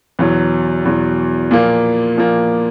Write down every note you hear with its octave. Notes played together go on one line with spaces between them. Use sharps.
E2 B2 F#3
E2 B2 F#3
A#2 F3 A#3
A#2 F3 A#3